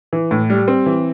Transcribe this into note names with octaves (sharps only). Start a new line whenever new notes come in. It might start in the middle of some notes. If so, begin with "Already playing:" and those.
E3
A2
G3
C4
E3